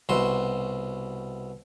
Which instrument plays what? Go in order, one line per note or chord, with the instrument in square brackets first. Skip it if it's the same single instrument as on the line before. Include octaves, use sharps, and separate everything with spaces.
[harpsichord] C2 B2 F#4 C6